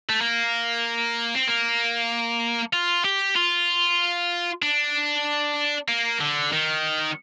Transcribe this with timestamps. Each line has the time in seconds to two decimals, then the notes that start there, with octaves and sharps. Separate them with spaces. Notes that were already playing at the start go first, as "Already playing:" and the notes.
0.10 A3
0.21 A#3
1.35 C4
1.47 A#3
2.73 F4
3.05 G4
3.36 F4
4.63 D4
5.88 A#3
6.20 D3
6.52 D#3